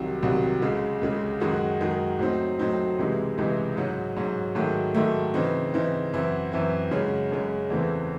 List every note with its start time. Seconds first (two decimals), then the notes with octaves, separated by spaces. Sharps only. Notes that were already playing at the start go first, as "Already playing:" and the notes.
Already playing: C2 C3 D#3 F#3
0.23 C2 C3 D#3 F#3
0.62 C#2 C#3 G#3
1.01 C#2 C#3 G#3
1.40 F#2 D#3 G#3 D#4 F#4
1.81 F#2 D#3 G#3 D#4 F#4
2.19 A2 F#3 C4 D#4
2.59 A2 F#3 C4 D#4
2.98 C#2 C3 E3 G#3 D#4
3.38 C#2 C3 E3 G#3 D#4
3.76 G#2 F#3 C#4 F#4
4.17 G#2 F#3 C#4 F#4
4.55 G#2 D#3 F#3 A3
4.94 G#2 D#3 F#3 A3
5.34 C#3 E3 C4 D#4
5.74 C#3 E3 C4 D#4
6.14 F#2 E3 C4 E4
6.52 F#2 E3 C4 E4
6.91 F#2 C#3 G#3 C#4
7.32 F#2 C#3 G#3 C#4
7.70 E2 C#3 E3 A3 C4